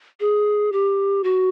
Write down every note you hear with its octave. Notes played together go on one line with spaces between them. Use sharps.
G#4
G4
F#4